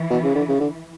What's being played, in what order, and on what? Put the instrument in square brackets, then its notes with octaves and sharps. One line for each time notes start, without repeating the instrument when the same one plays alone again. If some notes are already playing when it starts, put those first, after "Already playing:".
Already playing: [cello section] E3
[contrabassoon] B2
C#3
D3
C#3
D3